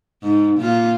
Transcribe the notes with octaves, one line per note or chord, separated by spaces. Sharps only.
G#2
A#2 F4